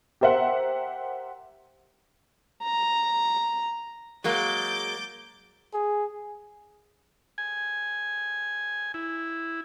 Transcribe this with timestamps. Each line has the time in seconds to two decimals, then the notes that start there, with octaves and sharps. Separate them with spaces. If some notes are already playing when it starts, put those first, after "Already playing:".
0.21 G4 A#4 C5 E5 F#5
2.63 A#5
4.24 F#3 G#3 A#3 D6 G6 A6
5.74 G#4
7.38 G#5
8.94 E4